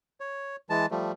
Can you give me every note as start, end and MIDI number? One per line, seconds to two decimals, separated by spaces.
0.20 0.56 73
0.70 0.86 52
0.70 0.86 56
0.70 0.86 81
0.91 1.12 53
0.91 1.12 55
0.91 1.12 57